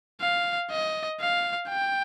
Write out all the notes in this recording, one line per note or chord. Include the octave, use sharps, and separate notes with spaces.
F5
D#5
F5
G5